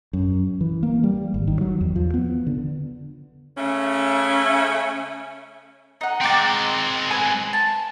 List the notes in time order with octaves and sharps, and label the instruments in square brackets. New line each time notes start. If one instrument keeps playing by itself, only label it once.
[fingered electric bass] F#2
E3
A#3
G3
G#1
D#3
F#3
E2
F3
B3
D3
[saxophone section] C#3 A3 C#4
[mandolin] D#4 F#5
[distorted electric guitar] G#3 C4 [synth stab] G5 D6 A6
[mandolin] B4 [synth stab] G#5
[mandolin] A5